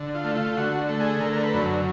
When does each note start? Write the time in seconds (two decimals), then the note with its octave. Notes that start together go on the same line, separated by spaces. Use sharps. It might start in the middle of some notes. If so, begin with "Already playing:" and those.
Already playing: D3
0.15 F4
0.24 A3
0.35 F4
0.57 D3 F#4
0.89 A3
1.00 G#4
1.21 D3 A#4
1.33 A#4
1.43 B4
1.54 F#2